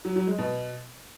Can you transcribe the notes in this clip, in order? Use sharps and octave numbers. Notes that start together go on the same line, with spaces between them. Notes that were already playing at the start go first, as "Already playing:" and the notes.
F#3
F#3
G#3
B2